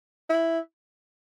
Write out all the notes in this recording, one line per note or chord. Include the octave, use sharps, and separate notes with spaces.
E4